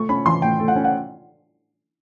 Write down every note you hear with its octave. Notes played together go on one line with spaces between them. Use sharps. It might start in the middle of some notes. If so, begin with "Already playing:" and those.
Already playing: A3 C#6
C#4 B5
E3 C6
A2 G5
A3
F#5
C#4
F#5